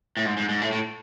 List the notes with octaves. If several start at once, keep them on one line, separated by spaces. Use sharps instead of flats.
A2
G#2
G#2
G#2
A2
A2